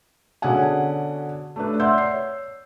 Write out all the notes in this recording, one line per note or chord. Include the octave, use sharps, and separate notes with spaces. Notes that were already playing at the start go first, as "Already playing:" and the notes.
B2 D3 C#4 G#4 F#5 G#5
A3 D4 B4
D5 E5 F#5 C6 E6 G6
C#5 C7